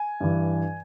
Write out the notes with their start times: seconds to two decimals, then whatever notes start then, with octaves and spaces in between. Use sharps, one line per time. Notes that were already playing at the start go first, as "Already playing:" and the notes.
Already playing: G#5
0.20 G2 E3